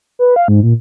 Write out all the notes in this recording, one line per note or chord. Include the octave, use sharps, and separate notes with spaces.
B4
F5
G#2
A#2